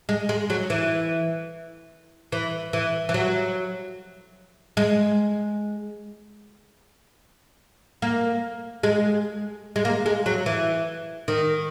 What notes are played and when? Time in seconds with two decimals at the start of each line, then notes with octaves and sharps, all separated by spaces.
0.09 G#3
0.29 G#3
0.50 F#3
0.70 E3
2.32 E3
2.73 E3
3.09 E3
3.14 F#3
4.77 G#3
8.02 A#3
8.83 G#3
9.76 G#3
9.85 A#3
10.06 G#3
10.26 F#3
10.46 E3
11.28 D#3